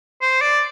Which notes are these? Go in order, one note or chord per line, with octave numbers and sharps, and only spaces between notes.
C5
D5